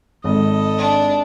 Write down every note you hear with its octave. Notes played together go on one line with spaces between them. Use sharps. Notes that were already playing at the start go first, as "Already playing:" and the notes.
G#1 A4 D#5
D4